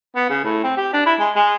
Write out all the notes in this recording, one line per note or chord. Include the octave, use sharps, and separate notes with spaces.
B3
C#3
A2
C4
G4
D4
E4
G#3
G#3